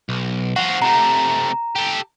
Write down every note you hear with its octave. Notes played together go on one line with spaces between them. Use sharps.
B1
F3 F#4 F#5
C3 A3 A#5
G4 A4